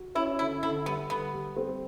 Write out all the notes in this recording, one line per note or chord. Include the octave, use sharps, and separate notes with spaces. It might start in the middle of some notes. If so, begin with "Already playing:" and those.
Already playing: F#4
C#4 E4
D3 E4
D3 E4
G3 B3
D3 B3
G3
C4